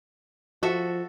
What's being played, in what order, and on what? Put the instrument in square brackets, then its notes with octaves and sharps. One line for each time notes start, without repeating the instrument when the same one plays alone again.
[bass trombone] F3 [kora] F#4 A4 E5